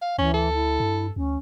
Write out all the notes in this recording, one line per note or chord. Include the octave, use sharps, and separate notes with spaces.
F5
D2 E3 C#4
A4
E4
G2
D2 C#4